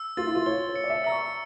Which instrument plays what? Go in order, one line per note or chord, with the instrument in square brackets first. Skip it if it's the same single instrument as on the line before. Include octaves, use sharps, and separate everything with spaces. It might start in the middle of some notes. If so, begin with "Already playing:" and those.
Already playing: [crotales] E6
[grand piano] F4 [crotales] A6
[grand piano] E4
F4
[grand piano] C#5 [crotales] G7
[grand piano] C#5
[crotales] C#7
[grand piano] D5
E5
[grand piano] A#5 [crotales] E6
[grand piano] C#6